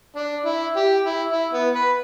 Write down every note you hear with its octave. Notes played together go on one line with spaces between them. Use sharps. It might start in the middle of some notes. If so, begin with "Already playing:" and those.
D4
E4
G4
E4
E4
B3
B4